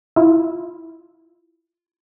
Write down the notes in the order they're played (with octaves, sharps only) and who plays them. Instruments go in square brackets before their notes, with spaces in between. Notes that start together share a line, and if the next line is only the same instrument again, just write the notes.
[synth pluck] E4 F4